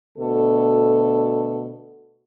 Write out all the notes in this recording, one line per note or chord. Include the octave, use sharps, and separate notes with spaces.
D2 B2 A4